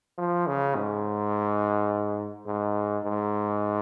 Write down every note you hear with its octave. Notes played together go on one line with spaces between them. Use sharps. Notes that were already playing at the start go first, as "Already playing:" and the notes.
F3
C#3
G#2
G#2
G#2